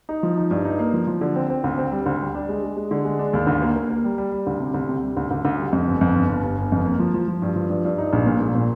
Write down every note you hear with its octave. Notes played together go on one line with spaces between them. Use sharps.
D#4
F3
D#4
G2
D#4
A#3
F3
F3
D3
C4
C4
D2
C4
G3
D2
G3
D4
G#3
G#3
G#3
D3
G#3
D4
D#2
D2
A#3
A#3
A#3
G3
G3
G3
D2
C3
D2
C3
G3
D2
D2
D2
G3
F2
G1
F2
G1
G1
G1
G1
F2
A#3
F3
F3
F3
G2
F3
G2
G2
D#4
A#1
A#2
A#1
A#2